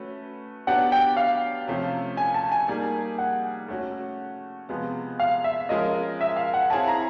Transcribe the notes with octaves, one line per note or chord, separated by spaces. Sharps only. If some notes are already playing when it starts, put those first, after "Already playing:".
Already playing: A3 C#4 F#4 B4
F#3 B3 D4 G4 F#5
G5
F5
C3 F3 A3 C#4
G#5
A5
G#5
G3 A#3 D#4 G#4
F#5
A3 C#4 F#4
C3 F3 G#3 B3
F5
E5
F3 G#3 C#4 F4 A#4 D#5
E5
F5
F#5
C4 E4 G#4 C#5 F5 A5
A#5